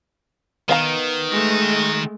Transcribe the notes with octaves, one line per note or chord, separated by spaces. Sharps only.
D#3 B3 F5 A#5
G#3 A3 F#4